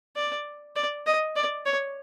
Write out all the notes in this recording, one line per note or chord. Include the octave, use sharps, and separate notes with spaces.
D5
D5
D#5
D5
C#5